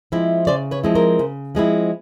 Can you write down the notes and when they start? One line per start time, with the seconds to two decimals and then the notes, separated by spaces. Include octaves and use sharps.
0.12 F3 G#3 C4 E4
0.47 C#3 C5 D5
0.71 B4 C#5
0.83 F3 G#3 C4 E4
0.95 A#4 C5
1.19 C#3
1.55 F3 G#3 C4 E4